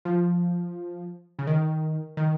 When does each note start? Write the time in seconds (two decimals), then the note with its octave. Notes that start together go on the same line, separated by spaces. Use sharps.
0.05 F3
1.39 C#3
1.47 D#3
2.17 D#3